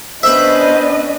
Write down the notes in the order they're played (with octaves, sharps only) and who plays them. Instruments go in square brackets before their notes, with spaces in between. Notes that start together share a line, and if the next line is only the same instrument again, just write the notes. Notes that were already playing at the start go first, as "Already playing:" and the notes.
[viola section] B3 C#4 B4 [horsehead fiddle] D4 D#5 [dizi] C5 [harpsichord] E5 B5